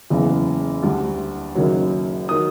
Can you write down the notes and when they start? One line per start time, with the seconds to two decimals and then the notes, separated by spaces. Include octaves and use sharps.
0.10 F#1 E2 C#3
0.83 D2 D3 G3
1.55 F#1 F#2 D#3 F#3
2.29 D#3 F#3 D#6